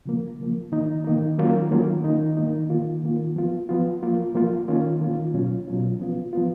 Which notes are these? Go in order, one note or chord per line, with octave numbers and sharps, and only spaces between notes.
C#3 F3 A#3
C#3 F3 A#3
D#3 A#3 D#4
D#3 A#3 D#4
D#3 F#3 A#3 C#4 F4
D#3 F#3 A#3 C#4 F4
D#3 A#3 D#4
D#3 A#3 D#4
D#3 A#3 F4
D#3 A#3 F4
F3 B3 F4
F3 B3 F4
F3 A#3 F4
F3 A#3 F4
D#3 A#3 C#4 F4
D#3 A#3 C#4 F4
B2 F#3 C#4 F4
B2 F#3 C#4 F4
F3 B3 F4
F3 B3 F4